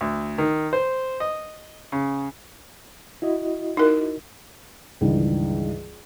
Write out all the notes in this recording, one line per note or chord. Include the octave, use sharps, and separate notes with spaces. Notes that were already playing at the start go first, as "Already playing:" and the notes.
D2
D#3
C5
D#5
C#3
E4 F#4 D#5
D#4 A#4
C#2 G2 D#3 E3